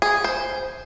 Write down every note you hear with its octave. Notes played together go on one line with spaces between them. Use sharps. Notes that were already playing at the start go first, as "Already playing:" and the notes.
G#4
C5